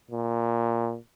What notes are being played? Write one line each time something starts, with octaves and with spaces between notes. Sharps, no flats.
A#2